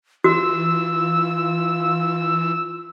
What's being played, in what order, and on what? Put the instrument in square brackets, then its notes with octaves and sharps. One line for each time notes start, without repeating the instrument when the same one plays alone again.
[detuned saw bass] E3 [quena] F4 [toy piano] F#4 [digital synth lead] E6